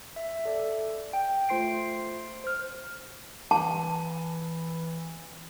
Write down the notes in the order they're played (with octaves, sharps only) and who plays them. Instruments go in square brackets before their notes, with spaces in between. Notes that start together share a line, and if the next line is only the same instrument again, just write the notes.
[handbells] E5
A4 D5 E5
G5
A3 F4 C5 C6 C7 D7
C5 F6
[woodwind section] E3 [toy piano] A5